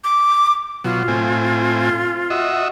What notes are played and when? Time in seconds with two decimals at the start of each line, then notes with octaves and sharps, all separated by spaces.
0.04 D6
0.84 B2 F#3 F4
1.08 A2 C4 G#5
2.30 F#4 D#5 E5